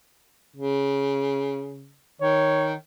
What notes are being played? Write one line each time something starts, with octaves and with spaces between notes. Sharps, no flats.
C#3
D#3 C#5